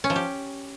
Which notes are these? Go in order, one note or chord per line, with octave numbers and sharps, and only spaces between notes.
C#4
F3
G4